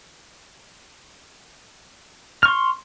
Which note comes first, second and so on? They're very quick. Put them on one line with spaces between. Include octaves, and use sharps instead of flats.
F6 C#6 C6